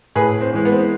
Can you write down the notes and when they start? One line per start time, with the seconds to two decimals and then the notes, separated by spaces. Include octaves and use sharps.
0.16 A2 G#4 B4
0.41 C4
0.53 E3 G#3
0.65 B3
0.72 C4
0.79 B3